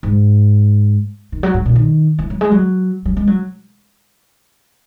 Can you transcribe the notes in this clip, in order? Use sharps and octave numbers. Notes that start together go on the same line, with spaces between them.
G#2
D#3
F#3
G#2
A#2
D#3
E3
F#3
G#3
F#3
F#3
G#3
F#3